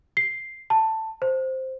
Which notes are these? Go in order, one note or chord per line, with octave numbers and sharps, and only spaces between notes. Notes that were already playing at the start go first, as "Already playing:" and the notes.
C7
A5
C5